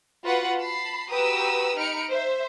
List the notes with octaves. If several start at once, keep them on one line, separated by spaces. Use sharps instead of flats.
F4 F#4 B4 F#5
A5 B5 C7
F#4 G4 B4 A#5 D#6 E6
D#4 B5 F6 C#7 D7
C5 E5